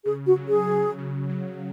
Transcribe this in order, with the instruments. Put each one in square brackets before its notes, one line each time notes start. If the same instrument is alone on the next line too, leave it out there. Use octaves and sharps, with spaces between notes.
[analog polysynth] C#3 [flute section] G#4
[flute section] F#4
[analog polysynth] F#3
[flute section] G#4
[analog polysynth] F#3
C#3
F#3